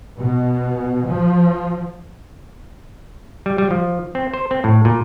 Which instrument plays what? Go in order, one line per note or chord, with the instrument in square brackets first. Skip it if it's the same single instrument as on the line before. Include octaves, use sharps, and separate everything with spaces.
[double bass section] B2
F3
[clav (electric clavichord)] G3
G3
F3
C4
C5
C4
A2
A#2